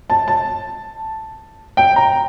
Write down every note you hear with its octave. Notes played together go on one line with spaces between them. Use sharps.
A5
A5
G5
A#5